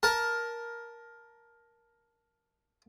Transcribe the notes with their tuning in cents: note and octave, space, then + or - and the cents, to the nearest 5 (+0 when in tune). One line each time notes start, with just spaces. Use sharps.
A#4 +10 A5 +0